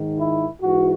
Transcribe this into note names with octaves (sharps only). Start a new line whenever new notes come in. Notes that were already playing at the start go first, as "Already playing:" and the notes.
Already playing: G#2 D#3
E4
G#2 E3 F#4